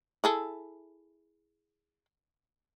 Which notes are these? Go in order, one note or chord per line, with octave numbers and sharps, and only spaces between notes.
E4 G#4 A4